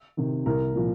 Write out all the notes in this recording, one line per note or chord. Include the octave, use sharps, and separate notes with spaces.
C3 D#3
C2 A#4
A#2 F3